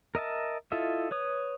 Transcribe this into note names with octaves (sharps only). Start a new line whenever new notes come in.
A#4 D#5 E5 A5
E4 F4 A4 D#5 E5
B4 C#5 D#6